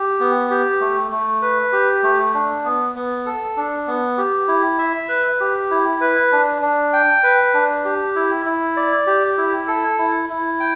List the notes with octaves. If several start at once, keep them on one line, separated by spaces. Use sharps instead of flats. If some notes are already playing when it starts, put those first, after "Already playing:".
Already playing: G4
B3
G4
A3
A3
B4
G4
A3
D4
B3
B3
A4
D4
B3
G4
E4
E5
B4
G4
E4
B4
D4
D4
G5
B4
D4
G4
E4
E4
D5
G4
E4
A4
E4
E4
G5